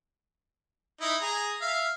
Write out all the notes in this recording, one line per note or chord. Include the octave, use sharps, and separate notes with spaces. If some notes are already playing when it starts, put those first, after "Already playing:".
D#4 E4 D#5
G#4 A#5
E5 F5